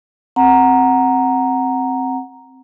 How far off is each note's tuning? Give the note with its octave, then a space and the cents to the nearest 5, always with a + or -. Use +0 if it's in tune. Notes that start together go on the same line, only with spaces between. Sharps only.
C4 +0 F#5 +0 A#5 +0